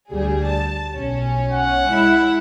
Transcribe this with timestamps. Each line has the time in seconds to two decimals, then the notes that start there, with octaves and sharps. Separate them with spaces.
0.11 D2 G3 G#4
0.47 A5
0.94 B1 C#4
1.51 F#5
1.89 G#3 E4